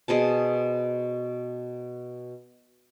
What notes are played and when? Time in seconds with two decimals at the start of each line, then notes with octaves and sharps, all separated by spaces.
0.08 B2 G#4 C5 A5